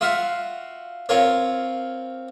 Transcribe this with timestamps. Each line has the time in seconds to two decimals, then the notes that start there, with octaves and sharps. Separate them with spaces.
0.01 F4 F#4 E5 F5
1.09 C4 F4 A#4 C#5